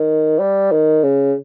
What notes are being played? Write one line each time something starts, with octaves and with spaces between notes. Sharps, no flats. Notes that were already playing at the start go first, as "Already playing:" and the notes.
Already playing: D#3
G3
D#3
C#3